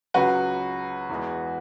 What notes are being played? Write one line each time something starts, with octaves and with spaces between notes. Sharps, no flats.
C#2 C#3 F#3 F#4 B4
E2 E3 G#3